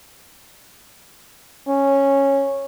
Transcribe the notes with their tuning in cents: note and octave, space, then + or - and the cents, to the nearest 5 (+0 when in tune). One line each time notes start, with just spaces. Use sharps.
C#4 -10